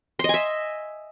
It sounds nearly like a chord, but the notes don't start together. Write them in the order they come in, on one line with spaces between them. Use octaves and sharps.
C6 D#5 G#5 E5